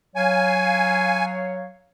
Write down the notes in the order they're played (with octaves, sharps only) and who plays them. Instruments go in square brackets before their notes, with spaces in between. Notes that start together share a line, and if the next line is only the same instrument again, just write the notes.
[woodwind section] F#3 C#5 F5 [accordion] G#5